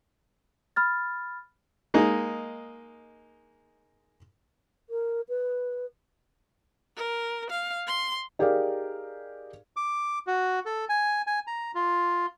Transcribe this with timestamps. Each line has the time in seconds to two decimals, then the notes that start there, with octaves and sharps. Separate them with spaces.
0.76 B5 F6 A6
1.94 G#3 A#3 D#4
4.89 A#4
5.29 B4
6.96 A#4
7.50 F5
7.87 C6
8.39 D#4 G4 G#4 A#4 D5 F5
9.76 D6
10.27 F#4
10.66 A4
10.89 G#5
11.27 G#5
11.47 A#5
11.75 F4